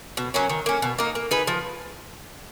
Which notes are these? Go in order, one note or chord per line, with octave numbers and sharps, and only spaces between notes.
B2
F#3 A#3 C#4
D#3
A#3 C#4
B2
A#3 D#4
A#3
D#4 G#4 B4
F3